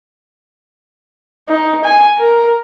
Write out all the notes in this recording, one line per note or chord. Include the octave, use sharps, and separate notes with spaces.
D#4
G#5
A#4